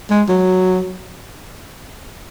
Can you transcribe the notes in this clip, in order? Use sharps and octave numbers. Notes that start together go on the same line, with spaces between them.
G#3
F#3